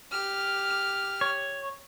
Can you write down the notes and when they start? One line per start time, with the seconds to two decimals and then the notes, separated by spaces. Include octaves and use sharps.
0.12 G4 F6
1.21 C#5